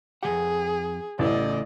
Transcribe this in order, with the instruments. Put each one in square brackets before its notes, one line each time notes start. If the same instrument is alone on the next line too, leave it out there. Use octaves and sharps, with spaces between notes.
[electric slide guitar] F2 D#3 F#5 [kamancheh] G#4
[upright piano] A1 [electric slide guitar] C#3 E3 A3 [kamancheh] D5 D#5